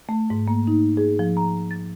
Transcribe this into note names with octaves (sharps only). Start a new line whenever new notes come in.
A3
G#2
A#3
D#4
G#4
F3
A#5
A6